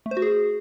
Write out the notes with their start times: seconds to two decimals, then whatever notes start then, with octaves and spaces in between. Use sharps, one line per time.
0.06 A3
0.11 C5
0.17 F#4
0.22 G#4